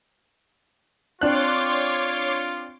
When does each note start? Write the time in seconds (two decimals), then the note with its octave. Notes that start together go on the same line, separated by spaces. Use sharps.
1.21 C4 D4 F4 C#5 C6 D6 F#6